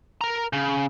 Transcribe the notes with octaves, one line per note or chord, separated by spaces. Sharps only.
A#4 A#5
C#3